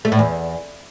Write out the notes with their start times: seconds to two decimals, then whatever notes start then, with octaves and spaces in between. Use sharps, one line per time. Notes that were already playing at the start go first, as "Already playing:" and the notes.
0.05 A3
0.12 A2
0.19 E2